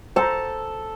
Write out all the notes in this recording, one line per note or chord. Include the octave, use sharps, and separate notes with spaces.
A4 C5 A5 A#5